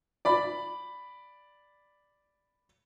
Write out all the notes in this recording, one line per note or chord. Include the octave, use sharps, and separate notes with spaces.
D5 B5